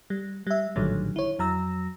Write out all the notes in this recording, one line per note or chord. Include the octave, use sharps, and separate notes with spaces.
G3
G3 E5
A#1 A2 D3 D#3 F#3 G3
E4 C#5
F2 F#3 A#5 E6 A#6